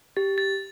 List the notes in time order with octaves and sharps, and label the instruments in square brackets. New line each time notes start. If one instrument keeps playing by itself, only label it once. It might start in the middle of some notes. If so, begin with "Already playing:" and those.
[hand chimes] G4 [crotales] A6
[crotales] A6